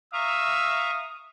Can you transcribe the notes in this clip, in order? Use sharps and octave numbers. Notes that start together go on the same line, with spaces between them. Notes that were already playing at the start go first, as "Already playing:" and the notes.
E5 F5 A#5 C#6 D#6 E6